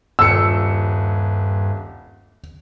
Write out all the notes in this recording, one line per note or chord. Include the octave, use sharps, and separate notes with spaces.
D#1 G2 E6 C#7